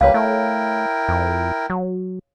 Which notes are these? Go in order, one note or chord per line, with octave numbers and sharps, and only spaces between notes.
C#2 G3 A#3 B4 C#5 F5
A3 E4 A#4 G5
F2
F#3